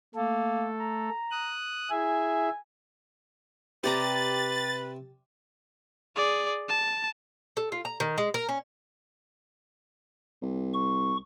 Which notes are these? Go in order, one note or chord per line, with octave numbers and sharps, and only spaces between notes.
A3 A#3 A4
A#5
D#6 F#6
E4 G#4 E5 G#5
C3 G4 B4 D5 A#5 A6
G#4 D5
A5
A4
F4
A#5
D#3
G#3
A#4
C#4
C2
C#6